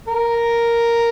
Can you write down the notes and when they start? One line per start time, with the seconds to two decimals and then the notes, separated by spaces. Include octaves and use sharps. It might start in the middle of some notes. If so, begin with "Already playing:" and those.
0.08 A#4